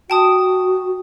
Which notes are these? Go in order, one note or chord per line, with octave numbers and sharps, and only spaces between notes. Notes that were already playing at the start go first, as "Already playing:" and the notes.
F#4 G5 A5 D#6